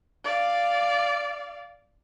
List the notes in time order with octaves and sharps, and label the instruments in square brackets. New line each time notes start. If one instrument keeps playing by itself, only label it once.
[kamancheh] D5 F5